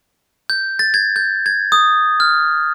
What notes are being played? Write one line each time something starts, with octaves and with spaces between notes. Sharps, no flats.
G6
A6
G#6
G6
G#6
D#6
F6